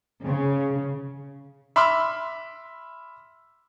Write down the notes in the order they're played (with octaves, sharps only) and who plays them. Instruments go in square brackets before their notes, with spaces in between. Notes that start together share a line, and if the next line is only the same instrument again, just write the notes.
[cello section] C#3
[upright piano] E5 B5 C6 D6 E6 F6